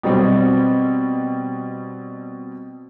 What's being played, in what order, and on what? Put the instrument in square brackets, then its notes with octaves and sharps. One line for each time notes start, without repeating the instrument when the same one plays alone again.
[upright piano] B2 G3 C4